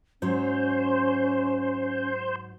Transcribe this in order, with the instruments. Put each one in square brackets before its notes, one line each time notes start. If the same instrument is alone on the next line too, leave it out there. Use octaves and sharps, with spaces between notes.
[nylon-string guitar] G#2 F#3 [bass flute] C#4 [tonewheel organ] C5